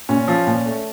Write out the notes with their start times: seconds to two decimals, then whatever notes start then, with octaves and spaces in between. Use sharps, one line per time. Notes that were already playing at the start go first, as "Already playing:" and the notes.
0.09 A#2 C#4
0.28 F3
0.47 A#2
0.66 A3